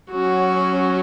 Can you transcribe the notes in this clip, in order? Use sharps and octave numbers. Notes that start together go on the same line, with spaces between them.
F#3 C#4 F#4